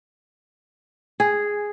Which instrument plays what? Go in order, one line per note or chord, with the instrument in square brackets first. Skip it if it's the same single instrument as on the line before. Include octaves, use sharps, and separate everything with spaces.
[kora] G#4